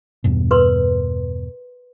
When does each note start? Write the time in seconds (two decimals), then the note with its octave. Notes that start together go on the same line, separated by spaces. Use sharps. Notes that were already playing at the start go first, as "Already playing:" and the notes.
0.24 E2 G2 B2
0.51 A#4 B4 C6